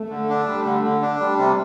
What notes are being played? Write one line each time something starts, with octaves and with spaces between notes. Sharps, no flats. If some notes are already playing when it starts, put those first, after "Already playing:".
Already playing: A3
D3
D4
G3
D3
D3
D4
G3
C3